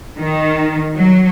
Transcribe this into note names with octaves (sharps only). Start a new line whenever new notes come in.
D#3
F#3